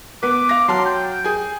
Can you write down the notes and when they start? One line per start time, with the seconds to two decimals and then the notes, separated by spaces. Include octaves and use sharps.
0.23 B3 B4 D6
0.49 F5 A#6
0.68 F#3 A5 C6 F6
0.85 G5
1.24 G#4 G#5